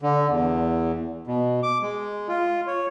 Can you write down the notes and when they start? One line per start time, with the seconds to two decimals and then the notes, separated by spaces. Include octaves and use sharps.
0.02 D3
0.30 E2
1.27 B2
1.63 D6
1.82 G#3
2.28 F4
2.67 C#5